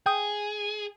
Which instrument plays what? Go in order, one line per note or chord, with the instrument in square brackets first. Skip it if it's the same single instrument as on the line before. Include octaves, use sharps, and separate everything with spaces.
[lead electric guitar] G#4 [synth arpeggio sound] G5 D#6